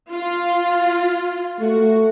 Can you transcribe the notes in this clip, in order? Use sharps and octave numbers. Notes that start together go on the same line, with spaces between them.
F4
A3 F#4